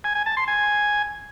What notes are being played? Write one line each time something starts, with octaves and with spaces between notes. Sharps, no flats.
G#5
G#5
A5
C6
G#5